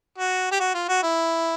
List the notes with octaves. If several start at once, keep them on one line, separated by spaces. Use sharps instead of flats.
F#4
G4
F#4
F4
F#4
E4